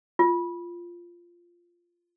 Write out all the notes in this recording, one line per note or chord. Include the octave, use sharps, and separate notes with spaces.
F4